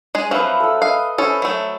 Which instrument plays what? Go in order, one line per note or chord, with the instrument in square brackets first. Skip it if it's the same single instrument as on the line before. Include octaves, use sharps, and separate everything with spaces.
[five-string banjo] G#3 G#4
[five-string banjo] F3 F#3 C4 [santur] B4 E5 F5
[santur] A4 E6
[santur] D#5 [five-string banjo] F5
[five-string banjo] C#4 A4 [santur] E4 C5 E6
[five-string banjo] F#3 A3